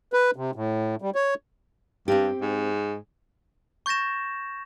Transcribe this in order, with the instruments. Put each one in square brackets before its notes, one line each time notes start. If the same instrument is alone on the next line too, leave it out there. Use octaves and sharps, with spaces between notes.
[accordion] B4
C3
A2
G3
C#5
[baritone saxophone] G2 [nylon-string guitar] C4 G4
[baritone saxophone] G#2
[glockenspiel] C#6 G6 A6 A#6 E7